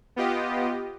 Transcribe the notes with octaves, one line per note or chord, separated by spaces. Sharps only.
B3 F4 G4 D#5